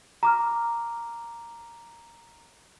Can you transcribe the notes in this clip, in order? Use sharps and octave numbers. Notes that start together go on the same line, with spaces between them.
A#5 D6 F6